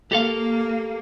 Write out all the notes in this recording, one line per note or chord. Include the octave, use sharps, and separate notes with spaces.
A#3 G4 A4 F5